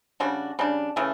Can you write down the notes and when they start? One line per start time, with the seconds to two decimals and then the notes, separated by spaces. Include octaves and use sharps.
0.20 C#3 G3 D4 F#4
0.59 C#3 G3 D4
0.96 C#3 E3 A3